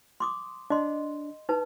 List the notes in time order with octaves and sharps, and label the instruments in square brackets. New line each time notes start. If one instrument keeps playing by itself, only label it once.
[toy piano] C6 D6 D#6
[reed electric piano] D4 [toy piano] D#5 C6
[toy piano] D#4 B4 A5